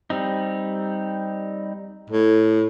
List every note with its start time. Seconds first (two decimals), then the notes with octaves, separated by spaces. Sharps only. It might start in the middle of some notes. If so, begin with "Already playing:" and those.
0.10 G3 C4 D#4
2.10 A2